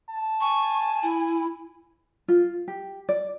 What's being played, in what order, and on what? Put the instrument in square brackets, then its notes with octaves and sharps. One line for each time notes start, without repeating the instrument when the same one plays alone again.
[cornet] A5
[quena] G#5 [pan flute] C#6
[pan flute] E4
[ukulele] F4
G4
D5